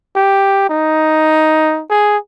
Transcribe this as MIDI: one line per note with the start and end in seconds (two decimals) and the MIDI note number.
0.15 0.65 67
0.69 1.83 63
1.90 2.17 68